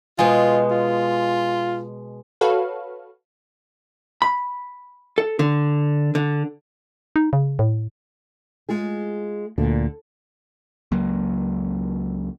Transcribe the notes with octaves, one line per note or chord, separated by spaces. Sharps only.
B2 G#3 F4
F4
F#4 A4 B4 C#5 F5
B5
A4
D3
D3
D#4
C#3
A2
G#3 F4 G#4
D2 A#2 D3
C#2 F#3 A#3